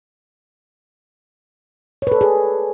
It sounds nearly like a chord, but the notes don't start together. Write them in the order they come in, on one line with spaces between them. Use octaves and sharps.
C#5 B4 A4 D5 G#4